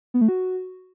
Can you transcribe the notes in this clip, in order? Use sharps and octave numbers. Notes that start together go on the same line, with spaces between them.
B3
A3
F#4